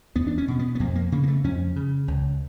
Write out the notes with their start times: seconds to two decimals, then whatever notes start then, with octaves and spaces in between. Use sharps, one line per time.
0.15 E2 B3
0.27 D4
0.38 C#4
0.48 B2
0.59 B3
0.75 B3
0.79 F2 A#3
0.95 A#3
1.12 C#3 A#3
1.24 A#3
1.28 A3
1.44 F2 C#4
1.76 C#3
2.08 C#2